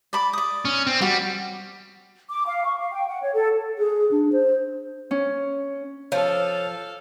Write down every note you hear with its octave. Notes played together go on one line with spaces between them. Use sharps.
D5 B5 D6
D5 D#6
C#4
C4
G3 F#4
D6
F5
C#6
F5
G5
F#5
C#5
A4
G#4
D4
C5
C#4
F3 A4 C#5 F5